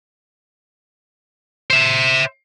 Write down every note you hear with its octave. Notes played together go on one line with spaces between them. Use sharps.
C5 E5